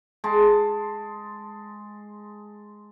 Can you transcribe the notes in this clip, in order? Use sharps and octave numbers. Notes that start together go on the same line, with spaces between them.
G#3 A5